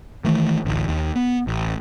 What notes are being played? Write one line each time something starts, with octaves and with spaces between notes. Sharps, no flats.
D#3 E3 A3
A1 D2
D#2
B3
A1